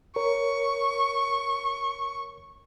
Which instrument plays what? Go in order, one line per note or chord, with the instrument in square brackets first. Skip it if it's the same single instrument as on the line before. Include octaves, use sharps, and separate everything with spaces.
[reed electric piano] A#4 C#5 [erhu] C#6